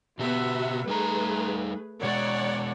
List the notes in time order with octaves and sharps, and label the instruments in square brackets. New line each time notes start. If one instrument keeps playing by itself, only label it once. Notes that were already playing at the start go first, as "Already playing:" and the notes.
[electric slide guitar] B2 G4 [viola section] B3 F#4 E5
[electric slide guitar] G3 D#4 A#5 [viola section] A3 G#4 B4
[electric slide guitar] B2 G#3 [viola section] C#5 D5 F#5